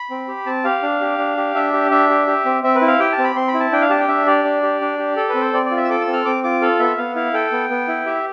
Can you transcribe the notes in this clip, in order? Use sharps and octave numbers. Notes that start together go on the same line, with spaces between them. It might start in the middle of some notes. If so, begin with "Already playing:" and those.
Already playing: B5
C4
G4
C4 A5
G4 F5
D4
G4
D4
G4
D4 E5
G4
D4 E5
G4
G4
C4
C4 E5
B4
E4
F5
G4 G5
A5
C4
B5
C4 C6
B5
E4
A5
D4 G5
F5
G4 A5
G5
D4 E5
G4 D5
D4
G4
D4
G4
A4
B4
C4
C5
C4 D5
D5
F4
E5
E6
A4 D6
E6
C4
F6
C4 D6
F4 D6
A4 F5
B3 E5
B3 F5
E4 F5
A4 G5
B3
B3
E4
G4 E5